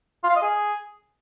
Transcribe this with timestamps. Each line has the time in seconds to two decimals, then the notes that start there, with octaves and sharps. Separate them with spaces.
0.23 F4
0.30 F5
0.36 D#5
0.42 G#4